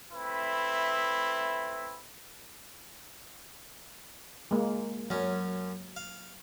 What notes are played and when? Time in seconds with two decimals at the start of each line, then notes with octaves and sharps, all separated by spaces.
0.12 A3 C4 E4 B4 E5 B5
4.51 G#3 A#3
5.10 F#2 F#3 C#4
5.96 F5